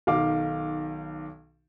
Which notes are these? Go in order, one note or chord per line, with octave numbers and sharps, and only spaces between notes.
B1 D#3 F5 D6